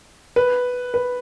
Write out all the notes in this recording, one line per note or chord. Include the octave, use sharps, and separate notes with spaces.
B4
B4